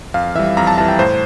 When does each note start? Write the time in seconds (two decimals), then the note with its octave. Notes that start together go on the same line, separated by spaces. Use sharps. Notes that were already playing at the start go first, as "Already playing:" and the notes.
0.14 F2 F5
0.35 E3 G3 E5
0.57 F2 A#5
0.67 A5
0.78 E3 G3 A5
0.88 G5
0.99 A2 C5